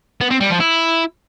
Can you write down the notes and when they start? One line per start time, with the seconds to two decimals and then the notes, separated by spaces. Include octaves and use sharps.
0.21 B3
0.30 C4
0.40 G3
0.50 F3
0.60 E4